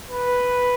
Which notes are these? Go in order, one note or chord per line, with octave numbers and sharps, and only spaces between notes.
B4